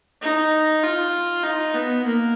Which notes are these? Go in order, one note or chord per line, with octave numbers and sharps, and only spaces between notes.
D#4
F4
D#4
B3
A#3